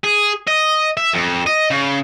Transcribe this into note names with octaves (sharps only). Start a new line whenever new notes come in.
G#4
D#5
E5
F2
D#5
C#3